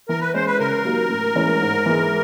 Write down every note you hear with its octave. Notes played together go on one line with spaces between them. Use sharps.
E3 A#4
B4
G#3 C#4 C5
B4
C#3 A#4
F#3 A#3 D#4 G4
A2
E3 G#3 C#4 E4
G#2
E3 G#3